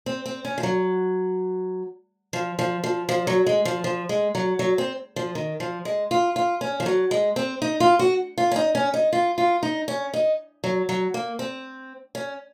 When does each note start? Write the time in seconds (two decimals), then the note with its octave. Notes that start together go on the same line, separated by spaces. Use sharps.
0.06 C4
0.26 C4
0.45 C#4
0.58 F3
0.63 F#3
2.33 F3
2.59 F3
2.84 F3
3.09 F3
3.27 F#3
3.46 G#3
3.65 F3
3.84 F3
4.09 G#3
4.35 F#3
4.59 F#3
4.78 C4
5.16 F3
5.35 D#3
5.60 F3
5.85 G#3
6.11 F4
6.36 F4
6.61 C#4
6.80 F3
6.86 F#3
7.11 G#3
7.36 C4
7.62 D#4
7.80 F4
7.99 F#4
8.38 F4
8.51 C#4
8.56 D#4
8.75 C#4
8.94 D#4
9.13 F4
9.38 F4
9.63 D#4
9.88 C#4
10.13 D#4
10.64 F#3
10.89 F#3
11.14 A#3
11.39 C4
12.15 C#4